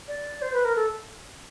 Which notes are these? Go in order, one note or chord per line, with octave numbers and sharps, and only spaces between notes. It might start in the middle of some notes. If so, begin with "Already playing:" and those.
D5
C5
B4
A#4
A4